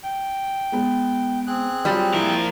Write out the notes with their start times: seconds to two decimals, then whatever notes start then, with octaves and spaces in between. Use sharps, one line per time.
0.03 G5
0.72 G#3 B3
1.47 C4 G#4 F#6
1.85 F#3 G3 F4
2.14 F3 E4 A#4